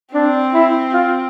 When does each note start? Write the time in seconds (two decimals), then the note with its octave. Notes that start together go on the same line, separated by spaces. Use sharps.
0.13 C4 D4
0.54 E4
0.93 F4